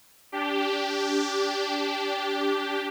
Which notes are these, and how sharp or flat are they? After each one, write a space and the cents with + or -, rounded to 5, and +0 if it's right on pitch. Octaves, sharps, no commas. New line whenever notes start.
D4 -20 G4 +0